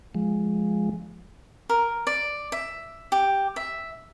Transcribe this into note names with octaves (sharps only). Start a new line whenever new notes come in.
F3 G#3
A#4
D5
E5
G4
E5